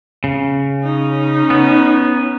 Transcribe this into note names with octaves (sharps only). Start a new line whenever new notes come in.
C#3
C#4 D#4
B3